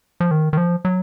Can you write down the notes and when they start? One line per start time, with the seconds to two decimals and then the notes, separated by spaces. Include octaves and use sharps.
0.20 F3
0.31 D#3
0.53 D#3
0.57 F3
0.85 F#3